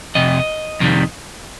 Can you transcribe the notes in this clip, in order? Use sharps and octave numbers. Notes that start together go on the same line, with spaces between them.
F2 C3 D#5
F2 C3 D#3 G3